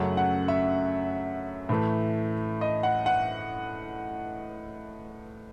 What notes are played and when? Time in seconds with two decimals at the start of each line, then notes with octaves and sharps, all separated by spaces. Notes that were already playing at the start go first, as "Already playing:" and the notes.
Already playing: F#2 C#3 F#3 A3 F#5
0.17 F#5
0.48 E5
1.69 A2 E3 A3
2.61 D#5
2.83 F#5
3.06 F#5